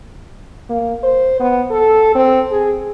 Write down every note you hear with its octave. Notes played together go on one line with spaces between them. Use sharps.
A#3
C5
B3
A4
C4
G#4